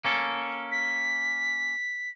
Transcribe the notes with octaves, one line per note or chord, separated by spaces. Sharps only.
A#3 C#4 A4
B6